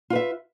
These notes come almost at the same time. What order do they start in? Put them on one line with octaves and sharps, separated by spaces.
F4 B4 E5